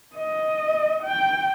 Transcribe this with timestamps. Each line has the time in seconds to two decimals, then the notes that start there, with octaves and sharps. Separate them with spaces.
0.16 D#5
1.04 G5